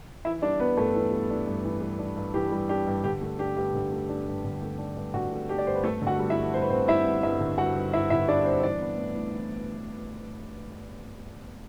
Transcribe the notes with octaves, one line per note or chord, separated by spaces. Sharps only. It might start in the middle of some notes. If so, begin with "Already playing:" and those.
E3 E4 E5
G3 D4 D5
B3 D4 B4
G2 A3 A4
E3
G3
D4
G2
E3
G3
D4
G2
E3 G4
G3
D4 G4
G2
D3 G4
A3
D4 G4
G2 G4
D3
A3
D4
G2
D3
A3
D4
G2
D3 F#4
A3
D4 G4
D5
G2 C5
B4
G2 A3 A4
D3
F#4 F#5
G3
E4 E5
G1
G2 C5
B4
D3 C4 C5
G3 E4 E5
G1
G2 E4 E5
D3
G3 F#4 F#5
G1
G2 E4 E5
D3 E4 E5
G3 D4 D5
G1 C4 C5
E3 D4 D5
B3
A2
A2
E3